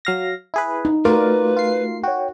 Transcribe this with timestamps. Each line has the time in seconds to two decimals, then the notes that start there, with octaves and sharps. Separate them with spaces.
0.05 F#3 F5 A#6
0.54 E4 G#4 B4
0.85 D#4
1.05 A3 F4 F#4 A#4 B4 D5
1.57 F4 C7
2.03 F#4 C#5 G5